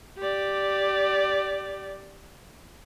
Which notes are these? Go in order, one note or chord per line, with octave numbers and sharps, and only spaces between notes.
G4 D5